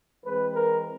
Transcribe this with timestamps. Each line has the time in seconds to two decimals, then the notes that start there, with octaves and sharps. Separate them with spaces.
0.23 E3 G#3 C4 B4
0.54 A#4